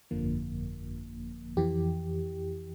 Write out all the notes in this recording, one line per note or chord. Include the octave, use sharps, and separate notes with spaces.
G1 F2 D3 F3 A#3
F2 E3 G4